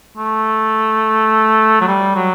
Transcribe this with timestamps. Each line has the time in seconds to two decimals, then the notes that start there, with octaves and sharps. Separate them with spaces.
0.17 A3
1.80 F#3
1.88 G3
2.15 F#3